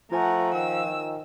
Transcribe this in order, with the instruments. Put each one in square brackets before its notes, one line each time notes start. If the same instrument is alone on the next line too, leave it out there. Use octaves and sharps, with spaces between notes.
[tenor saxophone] F3 [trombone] A3 [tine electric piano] F4 C5 G#5 [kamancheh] F#5 A#5
[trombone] D#3 [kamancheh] E6